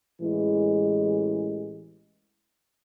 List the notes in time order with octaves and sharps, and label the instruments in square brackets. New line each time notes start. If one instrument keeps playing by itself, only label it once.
[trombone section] A1 E3 G#3